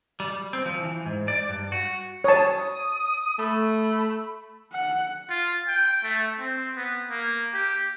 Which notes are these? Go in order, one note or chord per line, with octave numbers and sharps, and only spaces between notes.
G3
C4
F3
E3
G#2
D5
G2
F#4
C#5 A5 D#6
A3 B5
F#5
F4
G5
A3
C4
B3
A#3
G4